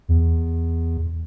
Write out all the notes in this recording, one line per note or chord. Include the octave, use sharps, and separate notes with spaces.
E2